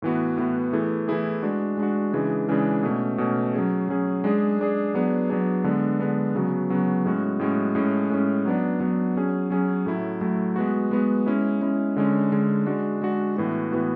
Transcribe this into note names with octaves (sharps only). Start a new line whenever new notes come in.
A2 E3 B3 F#4
A2 E3 B3 F#4
E3 A3 E4 G#4
E3 A3 E4 G#4
G#3 D4 F#4
G#3 D4 F#4
C#3 E3 G#3 D4 G#4
C#3 E3 G#3 D4 G#4
B2 A3 C#4
B2 A3 C#4
F#3 C#4 G#4
F#3 C#4 G#4
G#3 D4 G#4
G#3 D4 G#4
F#3 B3 D4 G#4
F#3 B3 D4 G#4
D3 G#3 B3 D4
D3 G#3 B3 D4
C#3 F#3 B3 F#4
C#3 F#3 B3 F#4
A2 G#3 C#4 F#4
A2 G#3 C#4 F#4
A2 G#3 C#4
A2 G#3 C#4
F#3 B3 D4
F#3 B3 D4
F#3 C#4 G#4
F#3 C#4 G#4
A2 F#3 A3 E4
A2 F#3 A3 E4
G#3 B3 F#4
G#3 B3 F#4
G#3 C#4 E4
G#3 C#4 E4
D3 G#3 C#4
D3 G#3 C#4
G#3 D4 F#4
G#3 D4 F#4
A2 E3 B3 F#4
A2 E3 B3 F#4